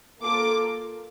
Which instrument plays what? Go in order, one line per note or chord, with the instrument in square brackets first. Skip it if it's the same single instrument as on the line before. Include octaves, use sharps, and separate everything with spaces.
[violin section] A#3 F4 A4 D6